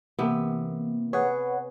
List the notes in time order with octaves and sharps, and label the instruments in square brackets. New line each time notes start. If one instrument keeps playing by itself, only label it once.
[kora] C3 B3 [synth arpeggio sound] E3 A#3
[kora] G#4 [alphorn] B4 [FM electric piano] C#5 F#5